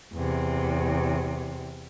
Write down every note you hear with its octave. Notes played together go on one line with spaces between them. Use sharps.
E2 C3